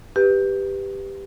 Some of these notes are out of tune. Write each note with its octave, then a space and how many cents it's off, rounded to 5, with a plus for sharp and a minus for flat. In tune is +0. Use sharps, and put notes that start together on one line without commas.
G4 +5 B4 +0